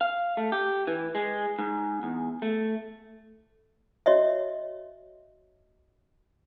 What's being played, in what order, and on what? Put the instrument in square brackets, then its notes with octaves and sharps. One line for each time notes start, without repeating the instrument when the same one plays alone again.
[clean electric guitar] F5
A3
G4
E3
G#3
G#2
E2
A3
[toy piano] F#4 C#5 D#5 E5